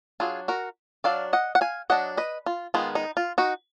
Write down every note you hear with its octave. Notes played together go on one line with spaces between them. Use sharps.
F#3 D4 F4 G#4
F#4 A#4
F#3 D4 D5 F5
D#5 F#5
F#5
F5 G#5
F#3 D4 D#5 F#5
B4 D#5
F4
D#3 G#3 B3 F4
D#4
F4
D#4 F#4